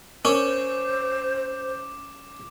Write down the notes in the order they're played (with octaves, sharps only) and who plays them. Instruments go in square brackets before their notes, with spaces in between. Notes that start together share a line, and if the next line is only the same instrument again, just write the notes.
[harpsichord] C#4 [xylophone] A#4 [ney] C5 [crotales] D6